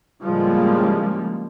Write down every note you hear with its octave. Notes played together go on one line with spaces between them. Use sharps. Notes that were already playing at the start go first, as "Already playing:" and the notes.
A2 C#3 F3 G3 G#3 A#3